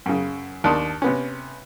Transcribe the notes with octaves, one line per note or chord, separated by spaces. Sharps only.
F#2 C#3
D#2 D4 A5 C6 D#6
C3 B3 C#4